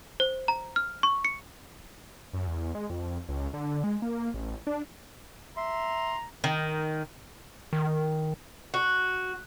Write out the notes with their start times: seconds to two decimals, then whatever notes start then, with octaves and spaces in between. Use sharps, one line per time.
0.20 C5
0.48 A#5
0.76 F6
1.03 C#6
1.25 C#7
2.33 F#2
2.47 E2
2.75 G#3
2.90 F2
3.29 C#2
3.54 D3
3.84 G#3
4.02 A#3
4.34 A1
4.67 D4
5.57 E5 A#5 C6
6.44 D#3
7.73 D#3
8.74 F#4